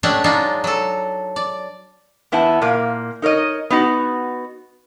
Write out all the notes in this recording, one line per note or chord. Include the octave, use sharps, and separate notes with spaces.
G#3 A3 C#4 D4 G4 F#5
F#3 G#3 D4 D#4 F4
F#3 A4
D5
E2 B3 E4 F#5 A5
A#2 A#3
D#4 A#4 C#5 D#5
B3 D#4 F#4